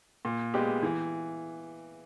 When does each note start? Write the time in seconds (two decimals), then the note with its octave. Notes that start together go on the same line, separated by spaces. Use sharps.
0.25 A#2
0.54 G#3 B3 G4
0.83 E3